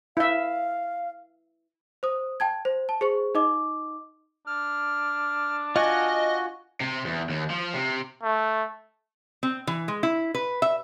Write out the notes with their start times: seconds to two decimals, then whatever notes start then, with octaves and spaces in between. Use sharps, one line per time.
0.17 E4 E5 F5
2.03 C5 D#6
2.40 G5 A5 G#6
2.65 C5
2.89 A5
3.01 G#4 C5 C#6
3.35 D#4 D#5 D6
4.47 D4 F6
5.76 F4 F#4 D#5 F#5 G#5
6.80 C3
7.05 E2
7.29 D#2
7.50 F3
7.74 C3
8.23 A3
9.43 C4
9.67 E3
9.88 G#3
10.03 E4
10.35 B4
10.62 E5